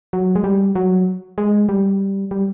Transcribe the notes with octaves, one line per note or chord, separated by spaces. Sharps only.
F#3
G#3
G3
F#3
G#3
G3
G3